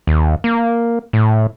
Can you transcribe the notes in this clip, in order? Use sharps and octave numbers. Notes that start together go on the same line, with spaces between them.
D#2
A#3
A2